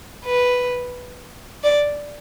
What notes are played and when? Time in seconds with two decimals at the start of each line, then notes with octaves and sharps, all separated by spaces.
0.25 B4
1.63 D5